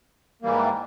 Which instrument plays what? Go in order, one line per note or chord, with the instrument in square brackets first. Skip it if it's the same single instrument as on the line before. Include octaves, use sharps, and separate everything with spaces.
[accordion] G#2 E3 G3 A#3